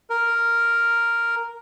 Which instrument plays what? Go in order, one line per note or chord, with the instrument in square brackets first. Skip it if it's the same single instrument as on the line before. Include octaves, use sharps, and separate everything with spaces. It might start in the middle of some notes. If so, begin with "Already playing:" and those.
[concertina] A#4